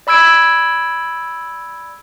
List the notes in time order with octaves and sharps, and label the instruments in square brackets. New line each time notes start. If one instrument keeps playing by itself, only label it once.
[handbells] D5 B5 E6 G#6 D7